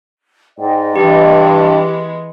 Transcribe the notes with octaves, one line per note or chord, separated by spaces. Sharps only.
G#2 D5 D#5 G5
G2 E3 G#3 B3 G4